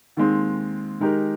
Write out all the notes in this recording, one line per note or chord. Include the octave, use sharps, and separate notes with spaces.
D#2 D#3 G#3 C4
D#3 G#3 D#4 G4 A#4